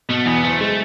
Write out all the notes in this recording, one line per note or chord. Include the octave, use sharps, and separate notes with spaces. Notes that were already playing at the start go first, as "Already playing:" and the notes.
B2 A3
E2 B3
F#1 A3
G#3 A3